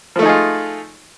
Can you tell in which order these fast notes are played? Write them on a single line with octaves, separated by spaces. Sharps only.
F3 A3 D#4 G#4 F4